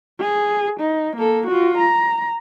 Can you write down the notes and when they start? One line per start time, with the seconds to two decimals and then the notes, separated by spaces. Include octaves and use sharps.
0.20 G#4
0.80 D#4
1.17 A#3 A4
1.47 F4 F#4
1.78 A#5